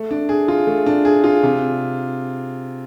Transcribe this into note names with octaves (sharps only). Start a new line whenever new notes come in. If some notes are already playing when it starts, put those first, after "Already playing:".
Already playing: A3
D4
G#4
F4
A3
D4
G#4
F4
C3